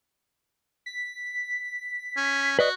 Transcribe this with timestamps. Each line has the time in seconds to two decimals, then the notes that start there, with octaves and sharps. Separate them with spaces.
0.86 B6
2.17 C#4
2.59 F#4 B4 D5 D#5